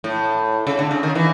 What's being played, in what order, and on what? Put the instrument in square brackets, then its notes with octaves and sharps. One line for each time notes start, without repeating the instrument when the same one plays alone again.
[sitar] A2
C#3
D3
C#3
D#3
E3